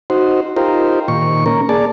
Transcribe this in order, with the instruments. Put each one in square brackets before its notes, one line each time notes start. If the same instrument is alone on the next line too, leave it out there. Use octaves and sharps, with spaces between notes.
[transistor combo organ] D#4 F#4 C5
D#4 F4 G4 A#4 C5
A#2 D#3 C#6
A#3 C#4 A#4
A#3 G#4 D5 A5